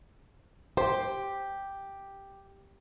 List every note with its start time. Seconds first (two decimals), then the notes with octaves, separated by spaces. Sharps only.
0.77 G4 C5